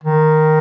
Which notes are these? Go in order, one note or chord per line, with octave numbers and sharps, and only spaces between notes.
D#3